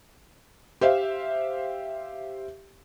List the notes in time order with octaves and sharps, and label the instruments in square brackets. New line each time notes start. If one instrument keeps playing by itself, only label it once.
[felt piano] G4 C5 E5 F5